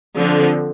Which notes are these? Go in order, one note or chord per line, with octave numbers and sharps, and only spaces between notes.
D3 F3 C4